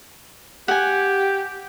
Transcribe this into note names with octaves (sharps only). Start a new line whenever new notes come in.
G4 F#5 G#5